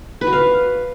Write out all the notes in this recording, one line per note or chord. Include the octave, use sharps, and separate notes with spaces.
B4
F#4
F5